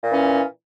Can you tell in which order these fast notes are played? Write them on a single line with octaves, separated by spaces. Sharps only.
A#2 E3 C#4